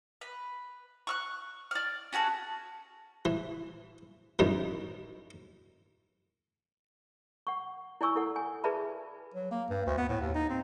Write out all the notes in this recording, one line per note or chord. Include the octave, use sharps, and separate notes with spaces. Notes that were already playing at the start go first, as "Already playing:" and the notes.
B4
C#6 E6 F#6
D5 F6
C#4 F#4 G#4 A4
E3
F#2 D#3 E3
F#5 C#6
E4 D5 G#5 C#6 E6
E4 A4 F#5
G#5
G#4 B4 D5 E5 A5 B5
F#3
A#3
G2
D2
B3
A2
D#2
D#4
C4